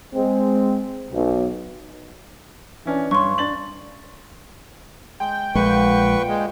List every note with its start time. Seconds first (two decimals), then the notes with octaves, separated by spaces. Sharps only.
0.15 G#3 C4
1.11 B1
2.85 E3 C#4 D4
3.11 G2 C#5 C6 C#6
3.38 D4 A6 F#7
5.20 G#3 G5
5.55 A#1 A#2 D3 G#3 B4 C#6
6.28 G#3